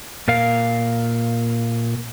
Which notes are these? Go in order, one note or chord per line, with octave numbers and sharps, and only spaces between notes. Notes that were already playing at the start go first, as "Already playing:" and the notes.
A#2 A#4 F5